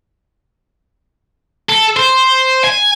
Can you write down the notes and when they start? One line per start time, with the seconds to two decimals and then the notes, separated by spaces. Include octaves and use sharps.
1.69 A4
1.96 C5
2.65 G#5